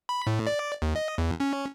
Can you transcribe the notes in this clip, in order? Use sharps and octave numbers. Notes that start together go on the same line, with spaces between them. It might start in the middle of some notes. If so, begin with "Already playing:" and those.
B5
A2
D5
D#2
D#5
E2
C#4